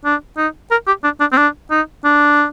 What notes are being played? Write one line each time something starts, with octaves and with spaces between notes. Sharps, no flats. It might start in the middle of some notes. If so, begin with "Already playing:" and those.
D4
D#4
A#4
G4
D4
D4
C4
D4
D#4
D4